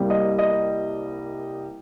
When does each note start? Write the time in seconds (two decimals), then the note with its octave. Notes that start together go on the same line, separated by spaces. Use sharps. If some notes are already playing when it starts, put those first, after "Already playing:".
Already playing: C2 C3 G3 A#3
0.10 D#5
0.39 D#5